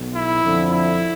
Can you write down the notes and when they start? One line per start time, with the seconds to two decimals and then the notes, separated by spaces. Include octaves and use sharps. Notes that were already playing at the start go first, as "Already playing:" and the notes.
Already playing: B1 B2
0.16 E4
0.44 F2 D3 F3
0.72 E4